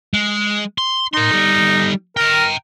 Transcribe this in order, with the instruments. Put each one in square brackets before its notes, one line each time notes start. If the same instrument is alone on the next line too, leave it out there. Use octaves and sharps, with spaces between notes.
[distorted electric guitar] G#3
C6
[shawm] D#4 [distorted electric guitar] A#4 C6
[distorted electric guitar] G3 A4
[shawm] A#4 [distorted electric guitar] G5 A#5